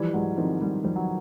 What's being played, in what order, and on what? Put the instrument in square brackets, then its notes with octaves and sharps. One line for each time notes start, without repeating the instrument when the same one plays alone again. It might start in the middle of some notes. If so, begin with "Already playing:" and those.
Already playing: [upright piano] E3 [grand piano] F3 G3
[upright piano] G#2 [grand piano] F#3 G#3
[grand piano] D#3 F3 [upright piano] C4
[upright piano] G3
[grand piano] F3 [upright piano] G3
[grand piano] F#3